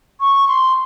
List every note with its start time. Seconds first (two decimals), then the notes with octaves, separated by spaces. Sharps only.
0.20 C#6
0.48 C6